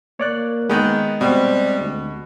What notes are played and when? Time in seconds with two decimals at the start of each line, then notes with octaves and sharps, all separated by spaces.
0.20 A#3 C#5 D5 F#6
0.69 D#3 G#3 B3 D#5 F#6
1.21 B2 G3 C4
1.80 D2